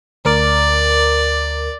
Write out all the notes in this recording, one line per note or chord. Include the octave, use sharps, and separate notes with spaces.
D2 A#4 D5 D6